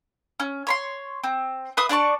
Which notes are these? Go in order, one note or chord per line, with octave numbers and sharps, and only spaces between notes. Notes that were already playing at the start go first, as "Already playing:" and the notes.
C#4
C#5 B5 C6
C4
B4 E5 C6 D#6
D4 D5 A5 C#6